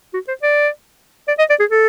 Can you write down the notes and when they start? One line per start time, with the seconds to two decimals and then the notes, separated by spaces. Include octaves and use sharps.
0.14 F#4
0.28 C5
0.43 D5
1.28 D5
1.39 D#5
1.50 D5
1.60 G#4
1.71 A4